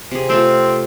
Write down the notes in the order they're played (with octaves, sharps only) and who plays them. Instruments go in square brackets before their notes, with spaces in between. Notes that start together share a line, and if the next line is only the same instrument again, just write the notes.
[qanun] C3 G#4
[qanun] A3 F4 [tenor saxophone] C4